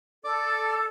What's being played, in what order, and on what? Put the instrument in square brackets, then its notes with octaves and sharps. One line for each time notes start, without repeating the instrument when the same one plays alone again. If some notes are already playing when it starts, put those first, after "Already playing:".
[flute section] A4 [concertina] D5 D6